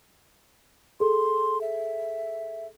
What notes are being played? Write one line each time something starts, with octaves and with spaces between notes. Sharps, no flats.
G#4 A4 C6
E5